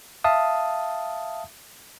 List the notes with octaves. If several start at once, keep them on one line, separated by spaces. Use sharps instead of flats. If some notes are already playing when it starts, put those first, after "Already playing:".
E5 F5 A5 D#6